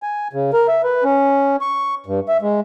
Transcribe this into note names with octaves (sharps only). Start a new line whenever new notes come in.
G#5
C#3
A#4
E5
B4
C#4
C#6
G2
E5
G#3